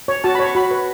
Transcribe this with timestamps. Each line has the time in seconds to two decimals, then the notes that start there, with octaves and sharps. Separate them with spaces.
0.08 C#5
0.24 F#4 A5
0.35 B5
0.40 C#5
0.45 C#6
0.55 F#4 B5
0.71 B4